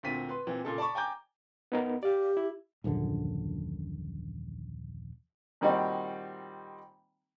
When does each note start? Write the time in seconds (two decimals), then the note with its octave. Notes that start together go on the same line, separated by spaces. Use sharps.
0.03 D2 A#2 C4 B6 D#7
0.29 B4 C6
0.47 A#2 E3 C4
0.65 A#2 C#3 A4
0.78 D5 A5 B5 C#6
0.95 G5 G#5 A#5 D6 G6
1.72 B3 D#4 A#4
2.03 G4 D5 F5
2.37 E4
2.84 D#1 A#1 F#2 D3
5.61 A#2 D#3 G3 C4 D#4 F#4